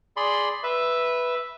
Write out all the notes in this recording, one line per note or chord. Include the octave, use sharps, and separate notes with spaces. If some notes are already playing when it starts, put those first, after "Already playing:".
G#4 D5 B5 C6
B4 E5